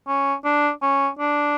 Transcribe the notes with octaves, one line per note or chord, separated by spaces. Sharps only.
C#4
D4
C#4
D4